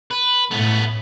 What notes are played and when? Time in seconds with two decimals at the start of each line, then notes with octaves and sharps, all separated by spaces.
0.11 B4
0.51 A2 A3 B3